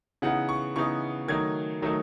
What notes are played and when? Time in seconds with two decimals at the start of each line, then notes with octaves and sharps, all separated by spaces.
0.22 C#3 E3 B3 D#4 F#5
0.49 C#6
0.76 C#3 E3 B3 D#4 C#6
1.28 D#3 F#3 A3 D#4 G#6
1.82 D#3 F#3 A3 D#4